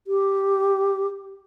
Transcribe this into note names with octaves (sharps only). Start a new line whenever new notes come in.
G4